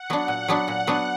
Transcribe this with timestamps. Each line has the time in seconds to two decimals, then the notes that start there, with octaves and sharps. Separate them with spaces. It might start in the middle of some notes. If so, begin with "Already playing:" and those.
Already playing: F#5
0.10 F#3 B3 D4
0.28 A#2
0.48 F#3 B3 D4
0.68 A#2 F#5
0.87 F#3 B3 D4